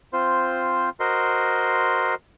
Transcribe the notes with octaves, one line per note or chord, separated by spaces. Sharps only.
C4 F4 C5
F#4 A#4 C5 D#5 C6